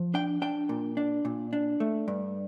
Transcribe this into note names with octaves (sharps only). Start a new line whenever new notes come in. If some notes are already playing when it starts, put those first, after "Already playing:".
Already playing: F3
D4 G5
D4 G5
A#2
D4
A#2
D4
A3
G2